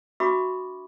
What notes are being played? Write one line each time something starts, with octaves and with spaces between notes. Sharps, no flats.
D4 F#4 E5 B5 C#6 D6